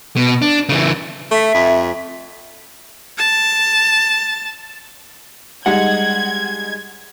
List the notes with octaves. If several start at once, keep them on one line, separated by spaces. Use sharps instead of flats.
B2
D4
C#3 E3
A3 E5
F2
A5
G3 G#3 D#4 F#5 G#6